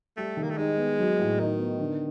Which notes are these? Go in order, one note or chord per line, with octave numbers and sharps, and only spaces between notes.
G3 A3
D#3
A#3
A3
G#3 D#4
B3
F#3
A2
D#3 D#4
B3
D3